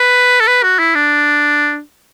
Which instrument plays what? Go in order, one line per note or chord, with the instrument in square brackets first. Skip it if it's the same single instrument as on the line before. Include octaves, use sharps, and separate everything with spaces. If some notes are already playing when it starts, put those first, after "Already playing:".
Already playing: [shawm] B4
A4
B4
F#4
E4
D4